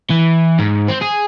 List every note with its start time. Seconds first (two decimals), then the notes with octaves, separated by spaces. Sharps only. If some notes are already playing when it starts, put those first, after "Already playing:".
0.10 E3
0.60 G#2
0.88 C4
1.01 G#4